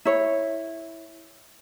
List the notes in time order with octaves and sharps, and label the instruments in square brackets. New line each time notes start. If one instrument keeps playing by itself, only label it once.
[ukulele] E4 C#5